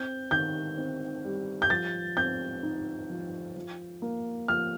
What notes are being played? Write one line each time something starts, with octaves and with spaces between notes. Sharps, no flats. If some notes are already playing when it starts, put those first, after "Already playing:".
Already playing: C4 G6
D#3 G6
C4
G3
G6
F3 A6
C4 G6
D#4
F3
F3
A#3
F3 F6